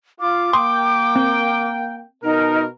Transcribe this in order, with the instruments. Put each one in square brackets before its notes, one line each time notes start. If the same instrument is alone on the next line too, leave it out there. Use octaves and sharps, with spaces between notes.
[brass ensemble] F4 [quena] D6
[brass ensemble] A#3 G5 [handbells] C6 D#6
[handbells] C4
[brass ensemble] B2 A#4 [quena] D#4